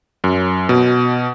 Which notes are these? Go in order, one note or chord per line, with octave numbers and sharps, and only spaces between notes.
F#2
B2